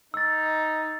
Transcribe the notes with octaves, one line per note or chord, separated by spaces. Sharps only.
D#4 E6 A6